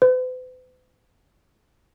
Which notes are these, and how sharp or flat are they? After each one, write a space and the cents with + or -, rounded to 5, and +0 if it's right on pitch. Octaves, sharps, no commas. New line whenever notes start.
B4 +45